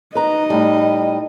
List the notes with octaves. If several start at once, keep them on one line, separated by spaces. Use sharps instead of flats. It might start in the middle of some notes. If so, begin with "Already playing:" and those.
D#4 B4 D#5 A#5
A2 G3